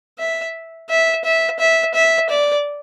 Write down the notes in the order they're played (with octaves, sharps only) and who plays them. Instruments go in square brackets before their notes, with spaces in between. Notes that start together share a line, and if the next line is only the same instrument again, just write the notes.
[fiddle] E5
E5
E5
E5
E5
D5